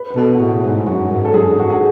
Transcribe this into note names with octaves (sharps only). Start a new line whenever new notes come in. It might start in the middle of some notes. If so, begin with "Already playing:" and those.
Already playing: B4
B4
B2 A4
F#4
A2 G#4
G#2
F#2 F#4
G#2
A4
F#2 G#4
G#2 F#4
G#4